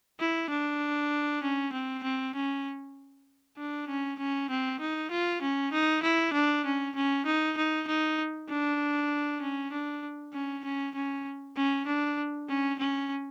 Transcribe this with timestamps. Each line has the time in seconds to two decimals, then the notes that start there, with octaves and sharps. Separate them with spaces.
0.20 E4
0.50 D4
1.43 C#4
1.73 C4
2.04 C4
2.35 C#4
3.58 D4
3.89 C#4
4.19 C#4
4.50 C4
4.81 D#4
5.11 F4
5.42 C#4
5.73 D#4
6.03 E4
6.34 D4
6.66 C#4
6.96 C#4
7.26 D#4
7.58 D#4
7.88 D#4
8.49 D4
9.42 C#4
9.72 D4
10.34 C#4
10.65 C#4
10.95 C#4
11.57 C#4
11.87 D4
12.49 C#4
12.79 C#4